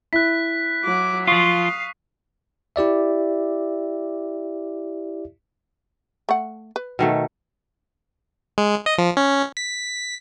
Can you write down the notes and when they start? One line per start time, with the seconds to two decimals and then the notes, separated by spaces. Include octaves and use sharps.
0.13 E4 F#6 B6
0.84 F#3 D6
1.27 F3 F4 F5 C#6 D#6 C7
2.76 E4 G4 D5 E5
6.29 A3 F#5
6.76 B4
6.99 B2 D#3 A3
8.58 G#3
8.86 D#5
8.98 F3
9.17 C#4
9.57 B6